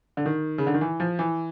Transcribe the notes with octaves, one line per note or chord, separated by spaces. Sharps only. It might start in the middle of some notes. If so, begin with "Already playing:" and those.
D3
D#3
C#3
D3
D#3
E3
F3
E3